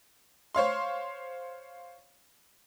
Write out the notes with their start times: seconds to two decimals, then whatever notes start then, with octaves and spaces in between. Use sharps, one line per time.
0.55 C5 C#5 F5 C6